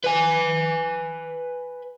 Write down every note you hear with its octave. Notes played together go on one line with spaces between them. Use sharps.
B4 G#5